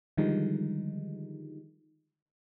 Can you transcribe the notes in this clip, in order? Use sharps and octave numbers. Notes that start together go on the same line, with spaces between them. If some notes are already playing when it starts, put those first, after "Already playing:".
D3 D#3 F3 G3 G#3 D#4